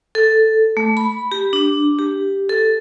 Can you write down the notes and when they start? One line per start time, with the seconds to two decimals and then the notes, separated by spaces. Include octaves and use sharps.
0.15 A4
0.77 A3
0.97 B5
1.32 G4
1.53 D4
1.99 G4
2.50 A4